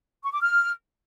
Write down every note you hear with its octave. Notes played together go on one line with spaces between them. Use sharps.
C#6
D6
F6